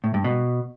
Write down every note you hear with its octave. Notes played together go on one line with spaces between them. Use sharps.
A2
G2
B2